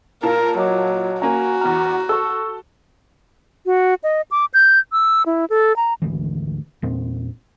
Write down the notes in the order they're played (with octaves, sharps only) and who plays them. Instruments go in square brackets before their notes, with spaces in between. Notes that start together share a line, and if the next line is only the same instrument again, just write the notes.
[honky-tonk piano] A#2 F5 A5 [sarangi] A#4
[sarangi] F#3 [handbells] D#5 D6
[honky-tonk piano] A#3 C#4 [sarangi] F#4 [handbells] G#5 A#5
[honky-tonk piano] E2 B3 F6 [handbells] A#5
[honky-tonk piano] A4 [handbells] C#6 E6
[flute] F#4
D#5
D6
G6
E6
E4
A4
A#5
[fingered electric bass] G#1 D2 E3
E2 A#2 C4